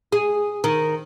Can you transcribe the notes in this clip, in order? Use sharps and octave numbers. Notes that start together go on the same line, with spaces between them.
G#4
D#3